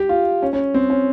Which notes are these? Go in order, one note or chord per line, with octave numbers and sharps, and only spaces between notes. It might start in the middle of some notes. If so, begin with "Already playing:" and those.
Already playing: G4
F4
C#4
C#4
C4
C#4